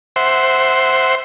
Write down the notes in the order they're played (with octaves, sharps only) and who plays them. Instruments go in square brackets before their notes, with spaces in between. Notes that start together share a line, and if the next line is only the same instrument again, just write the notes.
[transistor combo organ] C5 E5 F#5 C6